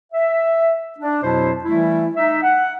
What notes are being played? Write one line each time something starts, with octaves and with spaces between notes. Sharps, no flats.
E5
D4
F2 B2 F#3 E4 C5 A5
E3 G3 A3 E4
D#4 E5
F#5